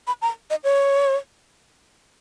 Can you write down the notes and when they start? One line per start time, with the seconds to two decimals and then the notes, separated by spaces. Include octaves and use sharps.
0.07 B5
0.22 A#5
0.50 D#5
0.64 C#5